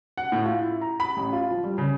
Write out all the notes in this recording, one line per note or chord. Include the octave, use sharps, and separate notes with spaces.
F#5
A2
F4
E4
A#5
B5
A1
F4
F3
G3
C#3